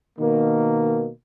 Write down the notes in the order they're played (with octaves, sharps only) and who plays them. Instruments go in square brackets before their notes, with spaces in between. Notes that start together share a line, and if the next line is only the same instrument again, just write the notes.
[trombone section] B2 D#3 A#3